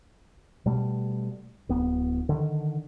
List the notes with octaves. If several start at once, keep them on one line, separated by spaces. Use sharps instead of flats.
B2 G3 A3
D1 B3
D3 D#3